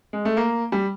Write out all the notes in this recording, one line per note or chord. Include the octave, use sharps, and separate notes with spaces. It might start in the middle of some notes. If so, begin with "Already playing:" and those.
G#3
A3
A#3
G3